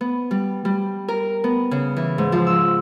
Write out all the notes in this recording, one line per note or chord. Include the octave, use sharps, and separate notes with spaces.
B3
G3
G3
A#4
B3
C#3
E3
G#2
F3
E6